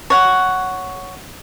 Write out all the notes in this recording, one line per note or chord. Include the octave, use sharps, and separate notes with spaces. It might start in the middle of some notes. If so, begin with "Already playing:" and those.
C#5 F#5